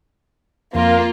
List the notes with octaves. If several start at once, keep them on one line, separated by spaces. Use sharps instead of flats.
F2 A#3 F4 A#4